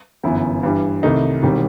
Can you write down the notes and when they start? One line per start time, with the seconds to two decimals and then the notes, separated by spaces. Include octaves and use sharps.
0.23 G1 F#2 E3 B3 E4
0.63 G2 E3 G3
1.03 C2 C3 D#3 A3 D#4
1.43 E1 D#3 G3 C4